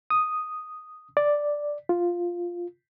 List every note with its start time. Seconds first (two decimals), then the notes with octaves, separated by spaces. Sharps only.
0.10 D#6
1.17 D5
1.89 F4